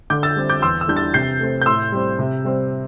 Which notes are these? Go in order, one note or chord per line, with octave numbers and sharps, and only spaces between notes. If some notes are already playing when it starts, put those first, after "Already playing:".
D3 D6 G6
E6 A6
G3 C4
D6 G6
E2 C6 E6
E6
E3 G3 D4 G6
E6 A6
C3 G6 C7
A3 C4
G6
A2 C6 E6
G3 C4
C3
G3 C4